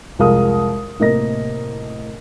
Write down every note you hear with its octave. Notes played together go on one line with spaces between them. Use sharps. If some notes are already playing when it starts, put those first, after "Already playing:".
C2 F2 G#3 A#4 F5 D#6
A2 C3 A#3 A#4 D#5 A#6